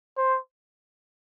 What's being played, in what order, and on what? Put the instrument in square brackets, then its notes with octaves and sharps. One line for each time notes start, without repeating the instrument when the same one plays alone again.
[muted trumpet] C5